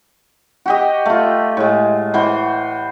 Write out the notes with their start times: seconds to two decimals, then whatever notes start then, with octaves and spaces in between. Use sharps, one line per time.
0.66 F#4 G4 D#5
1.06 A3 F4
1.57 A2 G#3
2.14 E3 F#4 C5